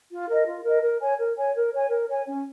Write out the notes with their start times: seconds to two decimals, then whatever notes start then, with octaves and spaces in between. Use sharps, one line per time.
0.10 F4
0.28 A#4 D#5
0.46 F4
0.64 A#4 D#5
0.82 A#4
1.00 C#5 G#5
1.18 A#4
1.36 C#5 G#5
1.54 A#4
1.71 C#5 G#5
1.90 A#4
2.08 C#5 G#5
2.26 C#4